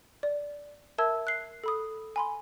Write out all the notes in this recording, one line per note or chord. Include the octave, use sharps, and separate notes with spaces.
D5
A#4 E5 A5 E6 G#6
F#6 C7
A4 B5 D#6
G#5 B5 C6